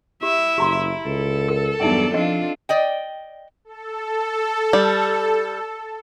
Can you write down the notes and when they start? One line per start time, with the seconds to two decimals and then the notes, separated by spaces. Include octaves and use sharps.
0.23 E4 G4 E5
0.58 F#1 G4 A#5 C6
1.06 C#2 A4
1.48 A#4
1.80 E2 G2 F#3 D#4 D5 E5 G5
2.14 F3 C4 D4 F4 D#5
2.69 D5 D#5 G5
3.65 A4
4.73 G3